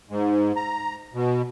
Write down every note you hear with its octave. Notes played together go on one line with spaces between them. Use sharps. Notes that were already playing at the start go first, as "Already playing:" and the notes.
G#2
A#5
B2